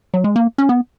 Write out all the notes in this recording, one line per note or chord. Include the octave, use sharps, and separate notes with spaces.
F#3
G#3
A#3
C#4
B3